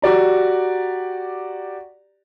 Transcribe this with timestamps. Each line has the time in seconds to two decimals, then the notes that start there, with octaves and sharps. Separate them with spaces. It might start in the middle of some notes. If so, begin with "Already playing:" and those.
0.02 F#4 G4 D5 A#5